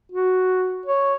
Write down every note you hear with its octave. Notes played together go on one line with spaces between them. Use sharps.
F#4
C#5